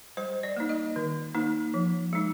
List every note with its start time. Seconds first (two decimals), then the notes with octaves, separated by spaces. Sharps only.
0.17 G3 C5
0.43 D5
0.56 A#3 D#4
0.69 D#5
0.96 D#3
1.35 A#3 D#4
1.74 F3
2.13 G#3 D#4